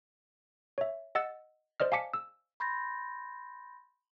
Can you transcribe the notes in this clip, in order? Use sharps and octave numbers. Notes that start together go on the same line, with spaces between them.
C#5 E5
D#5 F#5 E6 A6
C5 D5 D#5 F6
F5 G#5 A5 D6 B6 C#7
E6
B5 C6 G6 A6 A#6